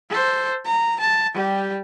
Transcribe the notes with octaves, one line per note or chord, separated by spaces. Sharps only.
A4 C5
A#5
A5
G3 G4